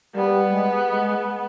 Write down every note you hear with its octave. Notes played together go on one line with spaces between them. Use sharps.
G3 B3
G#3
G#3